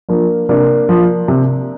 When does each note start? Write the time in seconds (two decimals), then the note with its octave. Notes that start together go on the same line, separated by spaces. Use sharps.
0.09 F3 A#3 D4
0.49 C3 A#3 D4
0.89 F3
1.28 C3